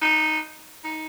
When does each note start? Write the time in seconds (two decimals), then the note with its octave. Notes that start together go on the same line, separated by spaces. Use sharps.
0.02 D#4
0.84 D#4